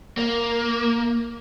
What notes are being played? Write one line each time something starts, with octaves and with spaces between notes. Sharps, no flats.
A#3